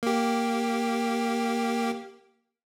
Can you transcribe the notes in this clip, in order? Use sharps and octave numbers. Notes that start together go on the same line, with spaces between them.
A#3 G4